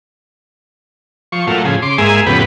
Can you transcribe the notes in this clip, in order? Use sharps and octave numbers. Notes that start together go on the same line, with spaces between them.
F3 C#6
A#2 F#3 A3 F4
A2 C#3 F3 G#4
C#3 C6 D6
G#2 G#3 A#3 G#4 E5 G#5
F2 A2 C#3 B3 G4 B4